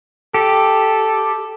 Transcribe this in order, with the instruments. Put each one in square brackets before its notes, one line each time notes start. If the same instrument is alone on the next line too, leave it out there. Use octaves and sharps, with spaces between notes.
[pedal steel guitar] G4 [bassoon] A4